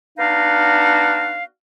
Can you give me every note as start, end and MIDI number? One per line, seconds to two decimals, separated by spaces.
0.18 1.45 59
0.18 1.45 62
0.18 1.45 63
0.18 1.45 66
0.18 1.45 74
0.18 1.45 77